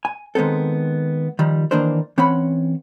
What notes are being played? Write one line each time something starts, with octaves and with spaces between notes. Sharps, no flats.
G#5
D#3 G#3 B3 C4 A4
D#3 F3 G3
D#3 E3 A#3 D4 A#4 C5
E3 C4 C#4 C#5 F#5 B5